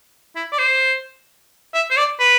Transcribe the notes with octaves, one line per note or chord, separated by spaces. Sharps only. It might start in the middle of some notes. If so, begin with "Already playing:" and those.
E4
D5
C5
E5
C5
D5
B4